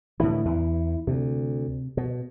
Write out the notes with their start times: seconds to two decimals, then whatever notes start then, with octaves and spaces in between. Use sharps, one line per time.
0.20 A2 D3 E3 E4
0.45 E2 E3
1.07 D2 C3
1.97 B2